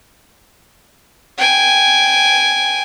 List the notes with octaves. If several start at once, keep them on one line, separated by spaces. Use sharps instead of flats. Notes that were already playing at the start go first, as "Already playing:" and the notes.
G5 G#5